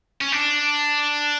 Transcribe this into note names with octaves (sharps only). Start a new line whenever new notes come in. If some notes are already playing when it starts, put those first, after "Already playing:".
C#4
D4